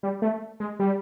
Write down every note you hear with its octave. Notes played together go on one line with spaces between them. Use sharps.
G3
A3
G#3
G3